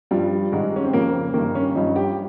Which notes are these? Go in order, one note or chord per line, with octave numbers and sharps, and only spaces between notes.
G2 F3 G3
G#2 D#3 G#3
C#4
C4
F2 C#3 F3 A#3
G2 D#3 A#3
C#4
G2 F3 D#4
G4